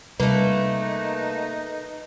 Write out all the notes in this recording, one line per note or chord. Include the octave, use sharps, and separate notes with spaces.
C3 G3 A3 A#3 D#4 B4 F#6